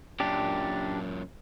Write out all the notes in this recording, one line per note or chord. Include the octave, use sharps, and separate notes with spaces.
F#2 A#2 D4 G4